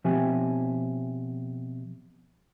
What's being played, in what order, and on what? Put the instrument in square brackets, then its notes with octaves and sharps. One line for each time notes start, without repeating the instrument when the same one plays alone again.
[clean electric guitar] B2 F3 C4 G4 E5 G#5